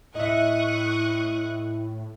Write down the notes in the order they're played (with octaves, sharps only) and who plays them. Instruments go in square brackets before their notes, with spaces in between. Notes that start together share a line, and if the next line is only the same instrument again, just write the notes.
[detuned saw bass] A2 [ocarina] E4 [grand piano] D#5 E5 [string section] C#6 D#6 F#6